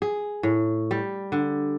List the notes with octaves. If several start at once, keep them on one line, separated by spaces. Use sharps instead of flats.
G#4
A2
G3
D3